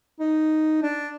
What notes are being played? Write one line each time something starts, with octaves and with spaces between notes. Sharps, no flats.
D#4
D4